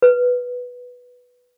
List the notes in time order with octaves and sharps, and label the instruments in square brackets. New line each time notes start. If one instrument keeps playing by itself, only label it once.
[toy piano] B4